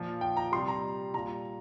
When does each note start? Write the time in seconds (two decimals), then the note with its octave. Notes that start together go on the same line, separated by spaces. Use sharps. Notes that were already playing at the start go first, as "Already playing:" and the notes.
Already playing: A#2 F3
0.21 G5
0.37 A#5
0.52 C3 G3 C6
0.68 A#5
1.14 A#2 G3 A#5